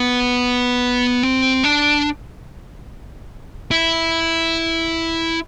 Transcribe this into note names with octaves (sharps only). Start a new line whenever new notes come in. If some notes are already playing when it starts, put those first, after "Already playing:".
Already playing: B3
C4
D4
E4